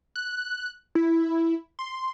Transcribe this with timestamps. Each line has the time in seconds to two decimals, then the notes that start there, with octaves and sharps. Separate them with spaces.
0.16 F#6
0.95 E4
1.79 C6